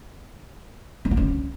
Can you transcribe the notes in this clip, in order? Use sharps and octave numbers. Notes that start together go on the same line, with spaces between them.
C4
B3
C#4